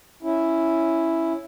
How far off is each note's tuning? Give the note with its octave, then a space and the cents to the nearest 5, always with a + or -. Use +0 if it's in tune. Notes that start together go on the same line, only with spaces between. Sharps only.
C#4 +0 E4 +0